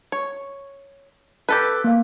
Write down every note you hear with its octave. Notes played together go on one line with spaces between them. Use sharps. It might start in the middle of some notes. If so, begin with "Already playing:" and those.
C#5
G4 A4 B4
A#3 F5